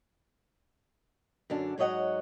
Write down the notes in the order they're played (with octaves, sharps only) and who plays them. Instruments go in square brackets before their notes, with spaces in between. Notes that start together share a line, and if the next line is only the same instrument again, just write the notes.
[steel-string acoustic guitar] F#2 D3 D4
G#2 F#3 C#5 D#5 F#5